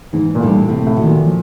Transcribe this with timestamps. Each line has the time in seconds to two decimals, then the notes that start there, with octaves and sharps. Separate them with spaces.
0.13 G#2 E3
0.35 A#2
0.41 A2 G3 A#3 D4
0.69 A2 C3
0.87 A2
0.96 D#3 F#3
1.06 A#2
1.25 F3